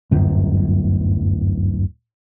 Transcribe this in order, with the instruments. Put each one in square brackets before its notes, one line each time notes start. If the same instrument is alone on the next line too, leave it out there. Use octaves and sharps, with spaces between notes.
[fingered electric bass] D1 G1 F#2